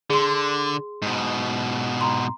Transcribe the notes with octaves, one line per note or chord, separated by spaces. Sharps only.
D3 G#4 C6
G#2 B2
A#5 C6